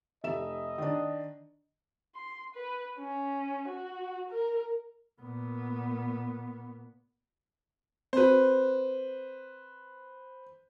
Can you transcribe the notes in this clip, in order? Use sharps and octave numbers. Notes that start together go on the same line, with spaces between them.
F1 D#5 E5 E7
D#3 D4
C6
B4
C#4
F#4
A#4
A#2 B3
C4 F#4 B4 C5